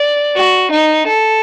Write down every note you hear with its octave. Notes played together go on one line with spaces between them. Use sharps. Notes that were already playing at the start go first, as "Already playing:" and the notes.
Already playing: D5
F#4
D#4
A4